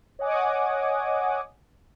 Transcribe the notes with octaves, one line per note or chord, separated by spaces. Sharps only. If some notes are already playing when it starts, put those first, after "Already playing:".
C#5 D#5 F#5 G#5 D6 D#6